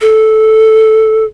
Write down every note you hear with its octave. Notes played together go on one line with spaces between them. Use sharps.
A4